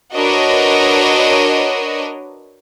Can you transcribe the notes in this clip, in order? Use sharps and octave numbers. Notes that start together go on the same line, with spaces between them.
D4 F#4 A#4 B4 C#5 D#5